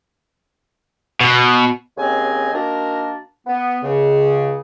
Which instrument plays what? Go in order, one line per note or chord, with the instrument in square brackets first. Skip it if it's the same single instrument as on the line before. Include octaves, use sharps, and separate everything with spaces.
[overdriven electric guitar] B2
[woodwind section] D#2 C#3 C4 D#5 G#5
D#3 A#3 D4 F#4 A#4
B3
C#2 C#3